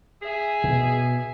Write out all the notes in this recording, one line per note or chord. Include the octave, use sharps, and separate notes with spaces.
G#4 E5 G#5
B2